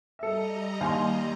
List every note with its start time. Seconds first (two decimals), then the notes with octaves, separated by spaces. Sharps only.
0.19 G3 A4 D#5 E5 A#5
0.81 D#2 F5 G#5 C6